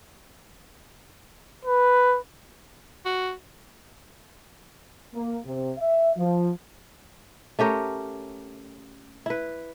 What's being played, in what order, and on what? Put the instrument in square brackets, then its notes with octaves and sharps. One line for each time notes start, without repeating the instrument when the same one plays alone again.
[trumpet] B4
[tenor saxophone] F#4
[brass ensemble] A#3
C3
E5
F3
[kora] A3 C#4 G4 A#4
E4 B4